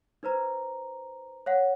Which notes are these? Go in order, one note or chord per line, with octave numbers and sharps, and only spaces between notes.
D#4 B4 C5 A#5
C#5 F5 F#5